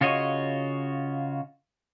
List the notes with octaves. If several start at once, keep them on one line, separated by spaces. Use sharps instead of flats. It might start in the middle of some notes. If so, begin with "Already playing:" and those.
C#3 F4 F#4 C#5 D#5